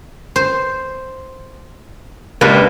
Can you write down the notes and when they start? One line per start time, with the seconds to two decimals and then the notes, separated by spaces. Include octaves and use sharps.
0.36 C5
2.41 C#2 A#3 D4 G4 B4